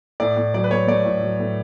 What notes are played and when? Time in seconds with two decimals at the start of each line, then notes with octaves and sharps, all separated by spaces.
0.20 A2 D5
0.36 A2
0.54 F#3 D5
0.64 B4
0.71 A3 C#5
0.87 A3 D5
1.05 A2
1.22 F#3
1.40 A2